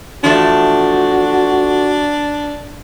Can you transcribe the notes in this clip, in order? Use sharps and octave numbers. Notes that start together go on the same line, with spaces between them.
E2 F3 A3 D4 F#4